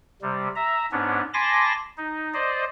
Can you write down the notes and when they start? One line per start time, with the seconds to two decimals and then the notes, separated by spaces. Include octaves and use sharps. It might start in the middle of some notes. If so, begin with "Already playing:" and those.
0.22 C3 G3
0.55 E5 A#5
0.92 G#2 B3 C#4 D4
1.34 G#5 A5 B5 C6 D6 A#6
1.97 D#4
2.33 C5 D5 D#5